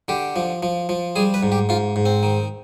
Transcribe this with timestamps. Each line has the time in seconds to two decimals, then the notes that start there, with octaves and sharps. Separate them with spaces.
0.08 D3 G4
0.36 F3
0.63 F3
0.89 F3
1.16 G3 G#4
1.34 B4
1.43 G#2
1.52 G4
1.69 G#2 F4
1.96 G#2
2.06 C4
2.23 D#3